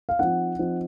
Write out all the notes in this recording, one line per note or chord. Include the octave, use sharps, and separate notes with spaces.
F5
F3 C4 D#4 F#5
F3 C4 D#4